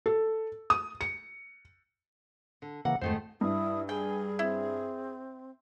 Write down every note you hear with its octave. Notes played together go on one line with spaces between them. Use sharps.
A4
D#6
C#7
D3
C#3 E3 A#3 F#5
F2 G#2 D#3 A3 C5
G2 E4 D#6
G#4 G5 G#5
C4 E4